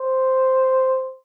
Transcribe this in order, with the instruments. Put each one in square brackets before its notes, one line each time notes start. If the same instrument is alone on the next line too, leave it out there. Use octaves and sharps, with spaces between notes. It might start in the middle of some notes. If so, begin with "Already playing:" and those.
Already playing: [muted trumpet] C5